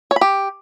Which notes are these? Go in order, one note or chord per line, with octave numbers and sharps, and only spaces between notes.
C#5
B5
G4